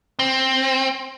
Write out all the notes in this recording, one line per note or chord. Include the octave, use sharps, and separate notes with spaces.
C4